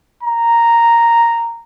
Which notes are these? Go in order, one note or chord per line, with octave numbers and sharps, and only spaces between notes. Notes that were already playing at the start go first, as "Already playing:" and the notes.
A#5